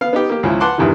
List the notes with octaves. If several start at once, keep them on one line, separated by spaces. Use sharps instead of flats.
B3 F5
B3 D#4 G4
A#3 G4
C#2 C#3 F3 E4
B4 F#5 A5 C6 D6 F#6
E2 G2 C3 D#3 E3